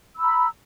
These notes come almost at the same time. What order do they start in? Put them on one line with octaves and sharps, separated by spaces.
E6 B5 A#5